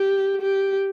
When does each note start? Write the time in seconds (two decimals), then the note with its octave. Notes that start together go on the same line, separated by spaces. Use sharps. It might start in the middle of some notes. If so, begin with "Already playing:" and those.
Already playing: G4
0.41 G4